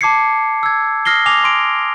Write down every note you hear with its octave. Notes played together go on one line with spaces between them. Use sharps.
A5 D6 G#6 C7 C#7
E6 G#6
D#6 F6 A#6 C7 G7
G#5 D6 A#6 F7
C6 D7